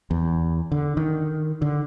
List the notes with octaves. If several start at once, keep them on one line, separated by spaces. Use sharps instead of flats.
E2
D3
D#3
D3